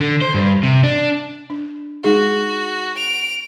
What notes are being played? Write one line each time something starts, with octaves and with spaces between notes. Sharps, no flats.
D3
C5
G2
C3
D4
D4
G#3 D#4 F#4 G#4
D7 F7